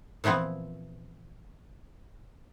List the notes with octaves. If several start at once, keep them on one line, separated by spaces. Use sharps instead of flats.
A#2 E3 F3 B3 C4